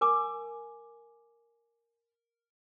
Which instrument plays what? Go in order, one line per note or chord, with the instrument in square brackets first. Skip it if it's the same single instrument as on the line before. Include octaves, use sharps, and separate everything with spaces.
[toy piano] A#4 G#5 D6